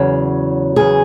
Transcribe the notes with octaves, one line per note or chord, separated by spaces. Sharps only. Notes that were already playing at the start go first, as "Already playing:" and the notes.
Already playing: E2 C#3 F#3
E2 C#3 F#3 G#4